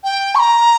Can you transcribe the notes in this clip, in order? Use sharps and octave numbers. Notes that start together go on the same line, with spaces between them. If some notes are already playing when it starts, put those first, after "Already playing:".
G5
C#6
A#5